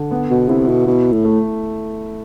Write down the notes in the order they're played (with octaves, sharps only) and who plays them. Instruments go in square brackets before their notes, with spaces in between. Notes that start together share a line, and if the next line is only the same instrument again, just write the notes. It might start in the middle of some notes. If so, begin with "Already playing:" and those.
Already playing: [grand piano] D3
B3
[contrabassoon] B2
[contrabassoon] C3 [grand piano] E4
[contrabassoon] B2
[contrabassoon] B2 [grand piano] E4
[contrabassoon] A2
[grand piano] A3